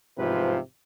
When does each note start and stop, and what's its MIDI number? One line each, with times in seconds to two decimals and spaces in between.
0.18 0.58 33
0.18 0.58 44
0.18 0.58 48
0.18 0.58 53
0.18 0.58 65
0.18 0.58 71